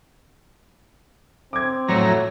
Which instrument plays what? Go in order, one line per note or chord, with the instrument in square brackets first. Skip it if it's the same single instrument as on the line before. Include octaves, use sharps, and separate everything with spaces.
[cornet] C4 [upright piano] D6 G#6
[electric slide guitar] F2 A3 C#5 [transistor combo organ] A2 F#3 A#5